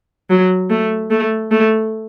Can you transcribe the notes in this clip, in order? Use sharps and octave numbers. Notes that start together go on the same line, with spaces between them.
F#3
A3
A3
A3